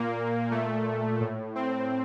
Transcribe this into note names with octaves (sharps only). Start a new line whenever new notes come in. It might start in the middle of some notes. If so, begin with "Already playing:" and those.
Already playing: A#2 A#3
A#2 A3
A2
C4